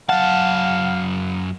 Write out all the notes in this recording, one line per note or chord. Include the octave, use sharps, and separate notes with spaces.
F#2 F5 F#5 A5